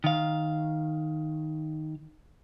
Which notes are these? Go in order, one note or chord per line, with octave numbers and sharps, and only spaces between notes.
D#3 F5